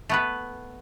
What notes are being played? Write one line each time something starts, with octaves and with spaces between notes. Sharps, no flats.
A3 B3 B4